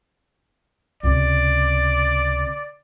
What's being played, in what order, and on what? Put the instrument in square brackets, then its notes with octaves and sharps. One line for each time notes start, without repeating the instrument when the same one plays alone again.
[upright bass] C#2 C3 [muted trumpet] D5